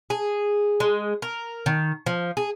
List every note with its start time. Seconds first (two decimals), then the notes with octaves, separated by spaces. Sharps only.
0.10 G#4
0.80 G#3
1.22 A#4
1.66 D#3
2.06 F3
2.37 G#4